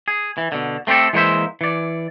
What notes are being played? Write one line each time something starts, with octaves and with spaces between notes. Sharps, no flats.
G#4
E3
B2 D3
A3 C4 D#4 G4 A4
E3 G#3 A#3 C5 E5
E3 D5